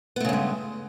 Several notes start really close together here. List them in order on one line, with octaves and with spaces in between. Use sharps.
B3 A3 C#3 G2 G#3